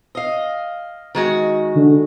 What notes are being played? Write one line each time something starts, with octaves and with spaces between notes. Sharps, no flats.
D#5 F5
D#3 G#3 F#4
D3